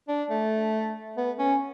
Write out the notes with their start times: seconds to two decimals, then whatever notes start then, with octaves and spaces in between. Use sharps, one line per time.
0.08 D4
0.30 A3
1.17 B3
1.39 C#4